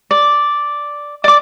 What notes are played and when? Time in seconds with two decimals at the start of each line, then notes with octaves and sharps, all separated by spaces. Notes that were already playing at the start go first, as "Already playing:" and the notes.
0.11 D5
1.24 D5 D6